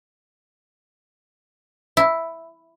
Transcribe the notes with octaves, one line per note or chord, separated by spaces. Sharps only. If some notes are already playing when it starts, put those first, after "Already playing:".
E4